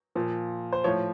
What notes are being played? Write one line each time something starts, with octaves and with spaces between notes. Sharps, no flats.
A#2 F3
C5
A2 F3 C#5